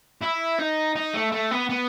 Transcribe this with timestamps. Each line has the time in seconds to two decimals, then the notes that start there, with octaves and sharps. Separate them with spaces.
0.22 E4
0.59 D#4
0.96 D#4
1.14 A3
1.32 A3
1.51 B3
1.69 B3